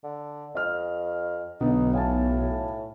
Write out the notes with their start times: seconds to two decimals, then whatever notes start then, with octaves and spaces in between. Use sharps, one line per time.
0.04 D3
0.55 F2 D#5 F6
1.61 B1 D3 B3 D#4
1.94 A2 F5 G#5 A5